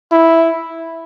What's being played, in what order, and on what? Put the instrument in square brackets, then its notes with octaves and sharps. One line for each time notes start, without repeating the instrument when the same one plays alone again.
[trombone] E4